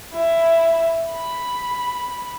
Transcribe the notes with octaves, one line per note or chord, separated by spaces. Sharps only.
E4
B5